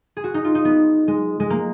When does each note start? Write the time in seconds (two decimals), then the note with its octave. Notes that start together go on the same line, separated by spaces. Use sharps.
0.17 G#4
0.24 F#4
0.34 D#4
0.44 F4
0.55 D#4
0.65 B3
1.08 G#3
1.40 G#3
1.50 A#3